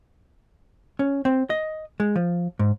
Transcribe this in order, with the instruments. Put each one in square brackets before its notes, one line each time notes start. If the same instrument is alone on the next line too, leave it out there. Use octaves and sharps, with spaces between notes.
[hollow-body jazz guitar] C#4
C4
D#5
G#3
F3
G#2